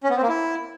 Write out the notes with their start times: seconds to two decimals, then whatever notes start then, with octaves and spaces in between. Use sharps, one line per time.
0.04 C#4
0.10 B3
0.16 C4
0.22 A#3
0.29 E4